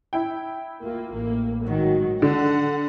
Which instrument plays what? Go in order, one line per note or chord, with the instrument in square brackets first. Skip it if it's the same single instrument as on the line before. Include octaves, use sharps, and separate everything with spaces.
[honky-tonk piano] E4 G5
[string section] A#3 F4
A1 A#3
G#2 D#3 F#3
[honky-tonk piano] D3 [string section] F#5